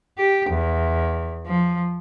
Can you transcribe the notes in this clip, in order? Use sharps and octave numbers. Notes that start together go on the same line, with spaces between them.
G4
E2
F3